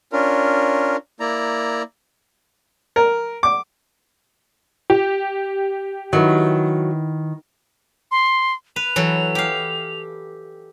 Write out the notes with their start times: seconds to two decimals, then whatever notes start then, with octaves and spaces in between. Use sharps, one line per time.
0.13 C#4 D4 F4 A#4
1.20 A#3 E4 D5 A#5
2.96 A#4
3.43 D6
4.90 G4
6.13 D#3 F#3 E4 B4
8.11 C6
8.76 B4 F7
8.96 E3 F#3 A4
9.35 G4 F5